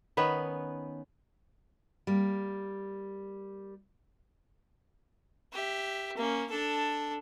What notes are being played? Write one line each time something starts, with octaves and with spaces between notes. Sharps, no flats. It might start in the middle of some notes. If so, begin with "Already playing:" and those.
D#3 B3 C#4 B4
G3 A#3
G4 E5
A#3 C#4
D4 A4